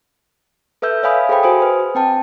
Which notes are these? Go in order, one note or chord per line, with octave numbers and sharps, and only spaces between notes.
A4 B4 E5 E6 G6
C#5 E5 F5 G#5 B5 D#6
G#4 A4 C5 G5 B5
F#4 C5 G#5 D#6
B4
C4 G5 A5